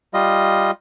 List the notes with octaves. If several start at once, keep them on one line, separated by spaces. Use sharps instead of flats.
G3 F4 D#5